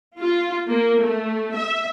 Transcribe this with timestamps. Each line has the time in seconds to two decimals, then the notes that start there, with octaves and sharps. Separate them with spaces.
0.19 F4
0.69 A#3
1.03 A3
1.55 E5